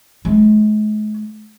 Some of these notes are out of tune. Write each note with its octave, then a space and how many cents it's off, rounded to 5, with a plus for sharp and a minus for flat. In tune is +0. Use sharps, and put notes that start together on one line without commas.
G#3 +45